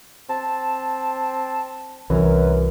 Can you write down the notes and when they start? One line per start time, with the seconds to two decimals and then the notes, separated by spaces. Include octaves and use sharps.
0.29 C4 A5
2.10 C2 F#2 E3 A#4 B4